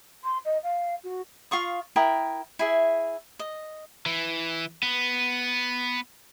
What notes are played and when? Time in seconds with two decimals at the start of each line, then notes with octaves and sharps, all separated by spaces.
0.23 C6
0.44 D#5
0.63 F5
1.03 F#4
1.51 F4 F5 C#6 D#6
1.96 E4 A#4 G5 D#6
2.59 E4 G#4 E5
3.39 D#5
4.06 E3
4.83 B3